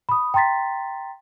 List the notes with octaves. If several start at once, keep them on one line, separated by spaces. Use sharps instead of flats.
B5 D#6
G5 A#5 C6 A6 B6